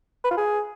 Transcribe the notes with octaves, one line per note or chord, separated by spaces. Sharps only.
B4
F4
G#4